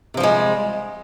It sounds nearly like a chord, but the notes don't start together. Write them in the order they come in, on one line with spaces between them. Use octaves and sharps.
C3 F3 G3 G#3